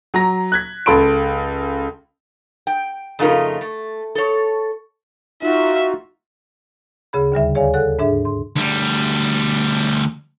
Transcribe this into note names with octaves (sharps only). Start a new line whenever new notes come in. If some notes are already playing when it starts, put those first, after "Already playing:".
F#3 A#5 A#6
F#6 G#6 B6
C#2 A4 B5 C6 D7
G5
F2 C#3 A3 D#4 F4 A#4
A3
A4 C#5
D#4 F4 F#4 E5
D2 C#3 G#4 B5
D#2 D3 G3 E5
G#4 C#5 D5 F5 G#5
A4 F#5 F#6
G#2 D4 G#4 E5
C6
D2 G3